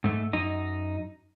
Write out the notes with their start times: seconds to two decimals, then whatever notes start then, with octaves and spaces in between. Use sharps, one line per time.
0.04 G#2 A3
0.33 F#2 D#4